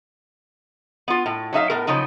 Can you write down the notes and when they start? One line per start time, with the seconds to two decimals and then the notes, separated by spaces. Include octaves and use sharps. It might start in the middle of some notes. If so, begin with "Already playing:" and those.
1.08 B3 F4
1.26 A2
1.53 F#3 D#4 E5 F5
1.70 A2 B3 A#4
1.87 C#3 F3 F#3 D#4